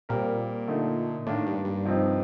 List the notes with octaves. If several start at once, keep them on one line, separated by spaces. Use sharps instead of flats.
A#2 G3 C4 G4 A#4
D3 A3 D#4
A2 D#3 A#3 D4
G2
G2
C3 F3 C4 D#4